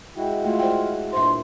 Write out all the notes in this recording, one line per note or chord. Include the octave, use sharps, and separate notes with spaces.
G#3 E4 F#4 G5
A3 F4
C5 D5 G5
G2 A#2 E4 C5 E5 C6